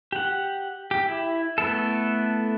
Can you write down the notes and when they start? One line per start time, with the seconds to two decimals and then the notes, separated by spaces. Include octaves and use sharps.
0.12 G4 F#5
0.91 G4
1.08 E4
1.58 A3 B3 E4 A4